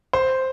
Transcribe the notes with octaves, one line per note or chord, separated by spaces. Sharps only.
C5